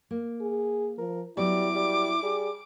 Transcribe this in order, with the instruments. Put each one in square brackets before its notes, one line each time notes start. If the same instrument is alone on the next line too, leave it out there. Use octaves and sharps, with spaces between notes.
[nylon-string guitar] A#3
[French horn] G#4
[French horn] F3 [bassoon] A#4
[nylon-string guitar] F#3 B3 [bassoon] G3 [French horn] E4 [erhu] D6
[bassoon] G3
[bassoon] G3 [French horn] G#4